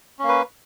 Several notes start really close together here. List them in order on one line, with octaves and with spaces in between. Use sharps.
C#4 A#3 B4